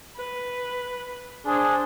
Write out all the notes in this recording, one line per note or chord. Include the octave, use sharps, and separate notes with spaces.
B4
D4 G#4 C5